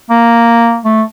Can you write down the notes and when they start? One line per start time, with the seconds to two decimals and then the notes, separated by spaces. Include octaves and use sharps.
0.10 A#3
0.85 A3